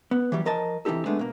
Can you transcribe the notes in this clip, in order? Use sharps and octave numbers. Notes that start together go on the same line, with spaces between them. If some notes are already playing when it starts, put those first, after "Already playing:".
B3
E3 F#3 G3
F3 A#4 D#5 A5
C3 E3 G3 D#4 G4 A4
G#3 A3 B3 D4
B2 A#3